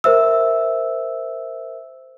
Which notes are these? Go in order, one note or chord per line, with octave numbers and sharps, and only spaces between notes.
A#4 C5 E5 E6